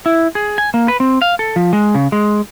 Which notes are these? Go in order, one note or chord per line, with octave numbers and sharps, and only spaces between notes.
E4
G#4
G#5
A#3
B4
C4
F5
A4
F3
G#3
C#3
G#3